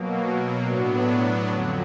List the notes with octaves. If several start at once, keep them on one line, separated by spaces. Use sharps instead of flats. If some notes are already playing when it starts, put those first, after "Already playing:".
Already playing: B2 F#3 A#3
A2 F#3 B3 D4
F2 D3 F#3